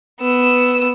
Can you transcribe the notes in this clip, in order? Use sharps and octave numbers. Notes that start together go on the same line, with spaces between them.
B3 E6